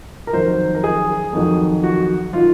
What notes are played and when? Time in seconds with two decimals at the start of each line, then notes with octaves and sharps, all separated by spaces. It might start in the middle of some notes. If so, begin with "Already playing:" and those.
0.27 A#4
0.33 F2 D#3 F#3 C5
0.75 A#4
0.84 G#4
1.33 F2 D#3 F#3
1.84 F#4
2.33 D#3 F#3 F4